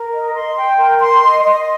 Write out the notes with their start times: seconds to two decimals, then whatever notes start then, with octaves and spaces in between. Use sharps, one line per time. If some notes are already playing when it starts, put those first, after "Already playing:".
Already playing: A#4
0.14 D#5
0.35 C6
0.57 G5
0.78 A#4
1.00 C6
1.22 D#5
1.44 D#5